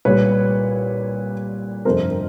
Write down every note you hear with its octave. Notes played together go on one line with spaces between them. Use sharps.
C2 A#2 G3 B4 C#5
G1 F2 C3 F3 A#4 C5